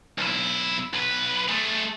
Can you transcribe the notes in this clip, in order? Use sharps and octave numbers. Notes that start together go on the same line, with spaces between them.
B1 E4
B1 B4
A3 G#4